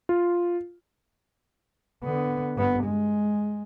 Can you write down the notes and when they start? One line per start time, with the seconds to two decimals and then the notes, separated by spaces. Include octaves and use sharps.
0.09 F4
2.04 D3 B3
2.56 G2 B3
2.84 G#3